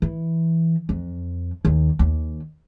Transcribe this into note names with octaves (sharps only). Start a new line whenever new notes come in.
E3
F2
D#2
D#2